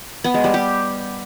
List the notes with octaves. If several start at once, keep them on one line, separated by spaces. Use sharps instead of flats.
B3
G#3
G3
G4